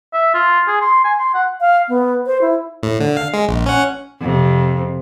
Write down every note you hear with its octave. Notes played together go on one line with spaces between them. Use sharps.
E5
F4
G#4
C6
G#5
C6
F#5
F5
B3
C5
E4
A2
D3
F5
G#3
A#1
C#4 F#5
F2 C3